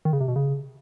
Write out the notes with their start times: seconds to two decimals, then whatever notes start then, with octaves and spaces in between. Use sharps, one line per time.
0.05 D#3
0.13 C#3
0.21 C3
0.28 B2
0.36 C#3